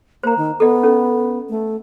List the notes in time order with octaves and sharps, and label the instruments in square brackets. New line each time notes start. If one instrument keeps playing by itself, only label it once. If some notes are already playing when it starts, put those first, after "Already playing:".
[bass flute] A#3 [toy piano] C5 A#5
[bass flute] D#3
[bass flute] B3 [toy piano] A4 D#5
[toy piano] C#4 A4
[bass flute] A3